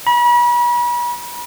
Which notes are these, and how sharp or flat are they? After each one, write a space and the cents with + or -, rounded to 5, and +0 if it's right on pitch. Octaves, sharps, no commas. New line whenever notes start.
B5 -40